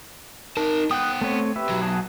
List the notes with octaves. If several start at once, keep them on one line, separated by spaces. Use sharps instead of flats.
D#4 A#4 A5
B3 G5 D#6 F#6
A3 C4 C#5
G4 B4 E5
B1 F#3
G#4 F#5 A5